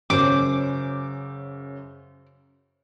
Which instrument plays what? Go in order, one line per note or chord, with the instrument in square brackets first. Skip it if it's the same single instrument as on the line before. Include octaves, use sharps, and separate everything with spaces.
[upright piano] F#2 C#3 [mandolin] C5 D6